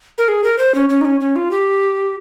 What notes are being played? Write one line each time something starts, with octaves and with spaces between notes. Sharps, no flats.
A#4
G#4
A#4
C5
C#4
C#4
D#4
C#4
C#4
F4
G4